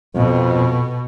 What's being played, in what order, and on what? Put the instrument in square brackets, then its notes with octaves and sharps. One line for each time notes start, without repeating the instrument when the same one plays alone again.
[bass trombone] F2 [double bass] B2